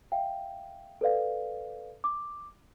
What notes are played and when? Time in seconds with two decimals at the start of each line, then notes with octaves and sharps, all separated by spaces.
0.12 E5 F5 G5
1.01 A4 B4 D5 F5
2.04 D6